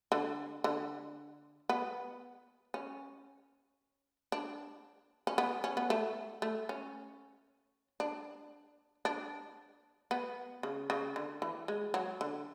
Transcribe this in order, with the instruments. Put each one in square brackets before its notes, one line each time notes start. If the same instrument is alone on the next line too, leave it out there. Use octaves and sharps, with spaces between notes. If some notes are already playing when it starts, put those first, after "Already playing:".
[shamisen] D3
D3
B3
C#4
D4
C#4
B3
C#4
B3
A3
A3
C#4
D4
D4
B3
C#3
C#3
D3
E3
G#3
F#3
D3